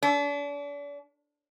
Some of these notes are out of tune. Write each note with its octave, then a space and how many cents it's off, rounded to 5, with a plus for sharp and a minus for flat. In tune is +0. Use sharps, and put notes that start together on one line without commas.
D4 -40